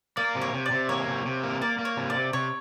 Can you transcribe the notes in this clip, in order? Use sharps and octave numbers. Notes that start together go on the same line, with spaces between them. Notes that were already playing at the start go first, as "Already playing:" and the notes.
A#3 D5
C3
C#5
C3
D5
C3
A#3 C#5
C3
C3
A#3
A#3 D5
A#3
C#5
C3
C3 D5
C3 C#5